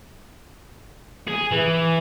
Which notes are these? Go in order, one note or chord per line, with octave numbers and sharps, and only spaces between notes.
G#4
E3